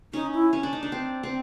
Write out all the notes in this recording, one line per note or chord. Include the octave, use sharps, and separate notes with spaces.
C#4 D#4
E4
C#4
D4
D#4
D4
C4
C4